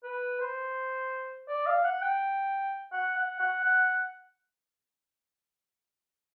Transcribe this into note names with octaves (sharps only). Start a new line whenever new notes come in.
B4
C5
D5
F5
F#5
G5
F#5
F#5
F#5
F#5